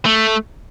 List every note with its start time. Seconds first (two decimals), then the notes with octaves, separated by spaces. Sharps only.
0.06 A3